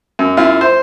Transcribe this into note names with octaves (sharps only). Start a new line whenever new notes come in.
F#2
F#2 E4 F4
C5